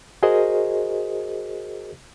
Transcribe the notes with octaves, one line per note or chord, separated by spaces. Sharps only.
F#4 G#4 A#4 C5 D#5